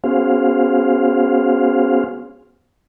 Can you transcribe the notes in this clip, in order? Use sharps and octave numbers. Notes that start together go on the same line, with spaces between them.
B3 C#4 F#4 G#4 C5 F5